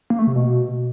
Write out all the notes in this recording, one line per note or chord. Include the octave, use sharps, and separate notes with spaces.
A#3
A3
C3
B2